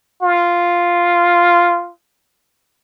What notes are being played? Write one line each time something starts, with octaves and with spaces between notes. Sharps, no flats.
F4